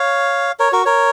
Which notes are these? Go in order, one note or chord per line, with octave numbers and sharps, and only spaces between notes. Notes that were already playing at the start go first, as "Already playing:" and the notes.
Already playing: C#5 F5
A#4 C#5
F#4 A#4
A#4 C#5